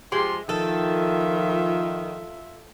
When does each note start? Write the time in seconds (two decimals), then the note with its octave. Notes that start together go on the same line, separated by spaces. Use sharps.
0.12 F3 G#3 G4 C6
0.49 D#3 F3 F4 A4 E5